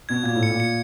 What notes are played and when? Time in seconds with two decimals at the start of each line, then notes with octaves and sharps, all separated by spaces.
0.09 B2 G#6
0.23 A#2 G#6
0.35 A2
0.43 C#7
0.49 A#2
0.60 C#7